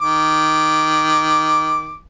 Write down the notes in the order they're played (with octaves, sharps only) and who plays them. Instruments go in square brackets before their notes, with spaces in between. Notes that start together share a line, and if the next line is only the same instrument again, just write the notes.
[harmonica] D#3 D6